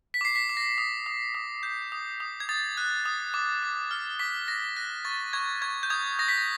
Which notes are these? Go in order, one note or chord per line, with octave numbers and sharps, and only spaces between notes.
B6
D6 C7
B6
D6
A#6
D#6
D#6
D#6
G6
D#6
D#6
G#6
D#6 A6
F#6
D#6
D6
D6
F6
D6 B6
D6 A#6
F#6 A#6
C#6 A6
C#6 G#6
C#6 G#6
G6
D#6 G#6
D#6 A#6
B6
A#6